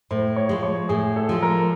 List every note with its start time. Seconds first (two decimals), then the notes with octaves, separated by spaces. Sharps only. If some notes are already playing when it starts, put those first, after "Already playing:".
0.11 A2 C5
0.36 C#5
0.49 F3 G#3
0.63 C#5
0.89 A2 G#4
1.16 A4
1.29 F3 G#3
1.43 A#4